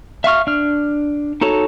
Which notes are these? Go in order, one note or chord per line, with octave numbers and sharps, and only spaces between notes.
E5 F5 C#6 F6
D4 F6
D#4 F#4 A4 C#5